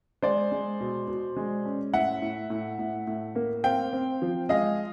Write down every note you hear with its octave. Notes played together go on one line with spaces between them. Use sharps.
G#3 C5 D5
G#3
B2
B2
G#3
C#4
A2 E5 F#5
A2
A2
A2
A2
A#3
C4 F5 G5
C4
F3
G#3 D#5 F5